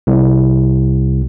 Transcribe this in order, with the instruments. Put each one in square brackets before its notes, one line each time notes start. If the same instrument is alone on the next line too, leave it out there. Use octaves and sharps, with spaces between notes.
[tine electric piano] C2